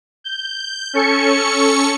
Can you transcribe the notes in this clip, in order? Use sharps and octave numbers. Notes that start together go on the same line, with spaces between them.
G6
C#4 A4 C#6 C#7